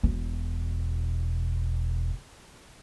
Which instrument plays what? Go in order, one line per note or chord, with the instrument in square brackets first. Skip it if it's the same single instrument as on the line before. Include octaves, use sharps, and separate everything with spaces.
[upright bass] E1 B2